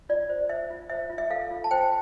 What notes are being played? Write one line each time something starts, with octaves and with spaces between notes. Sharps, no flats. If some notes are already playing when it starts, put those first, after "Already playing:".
F4 D5
C5
C5 E5
F4
C5 E5
F4
E5
A4 F5
F4
A5
C5 G5